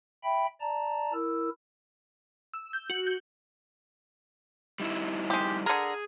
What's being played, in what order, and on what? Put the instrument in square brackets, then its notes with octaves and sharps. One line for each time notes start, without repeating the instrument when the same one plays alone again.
[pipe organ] E5 G5 B5
D5 A5 A#5
E4 A#4 E6
[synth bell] E6
G6
F#4
G6
[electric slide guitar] G3 D#4 E4
[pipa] G#3 G4
[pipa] D3 A#4 [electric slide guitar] G#4